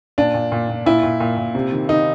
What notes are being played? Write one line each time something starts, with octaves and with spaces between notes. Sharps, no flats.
A#2 D4
A#2
A#2
A#2
A#2 E4
A#2
A#2
A#2
C3
D#3
D#3 D#4